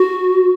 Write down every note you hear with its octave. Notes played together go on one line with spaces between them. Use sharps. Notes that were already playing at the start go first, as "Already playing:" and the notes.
Already playing: F#4